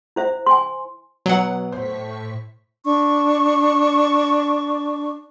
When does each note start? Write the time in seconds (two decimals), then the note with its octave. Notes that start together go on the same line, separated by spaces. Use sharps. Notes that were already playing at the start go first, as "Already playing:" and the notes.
0.16 E4 C5 E5
0.46 G#5 C6
1.26 B2 F#3 B3 F#5
1.72 A2 C5 C#6 B6
2.85 D4 C#6